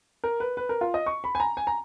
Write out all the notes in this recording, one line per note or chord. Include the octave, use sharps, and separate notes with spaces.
A#4
B4
B4
A#4
F4
D#5
C#6
B5
G#5
A#5
G#5
A#5